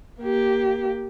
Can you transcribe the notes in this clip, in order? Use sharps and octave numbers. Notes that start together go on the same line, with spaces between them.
A#3 G4